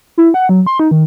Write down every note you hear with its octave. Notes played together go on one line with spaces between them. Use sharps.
E4
F#5
F#3
C6
D#4
D#3